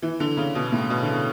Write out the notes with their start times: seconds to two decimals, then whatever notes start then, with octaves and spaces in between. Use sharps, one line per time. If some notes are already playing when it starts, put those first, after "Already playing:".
0.02 E3
0.20 D3
0.37 C#3
0.55 B2
0.72 A2
0.90 B2
1.03 D3
1.08 C#3